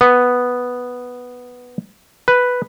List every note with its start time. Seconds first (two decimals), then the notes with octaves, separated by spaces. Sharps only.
0.01 B3
2.28 B4